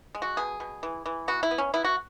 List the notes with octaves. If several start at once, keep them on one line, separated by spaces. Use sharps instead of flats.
G#3
F#4
B2 G#4
B2
E3
E3
B3 F#4
E4
B3
C#4
B3 E4
F#4